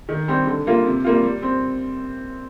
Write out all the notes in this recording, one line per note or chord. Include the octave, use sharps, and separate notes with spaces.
D#3
G3 C4 G4
D3
G3 A#3 F4
C3
G3 A#3 F4
G3
C4